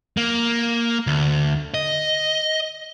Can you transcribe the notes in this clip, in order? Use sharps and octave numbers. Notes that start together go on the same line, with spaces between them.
A#3
D2
D#5